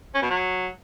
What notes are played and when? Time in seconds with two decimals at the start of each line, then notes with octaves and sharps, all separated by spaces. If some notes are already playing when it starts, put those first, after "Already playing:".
0.14 C#4
0.22 B2
0.30 F#3